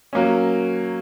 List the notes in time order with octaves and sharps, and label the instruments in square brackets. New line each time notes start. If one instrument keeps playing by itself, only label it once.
[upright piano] F#3 A#3 C#4